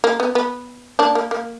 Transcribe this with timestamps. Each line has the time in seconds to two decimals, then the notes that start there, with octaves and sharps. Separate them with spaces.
0.04 A#3
0.20 B3
0.35 B3
0.99 A#3 D4
1.15 A#3
1.31 A#3